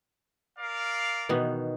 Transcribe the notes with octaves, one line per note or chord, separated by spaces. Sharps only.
A#4 D5 F5
B2 D#3 E3 B3